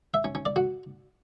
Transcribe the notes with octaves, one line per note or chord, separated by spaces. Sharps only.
E5
C#4
C#4
D5
F#4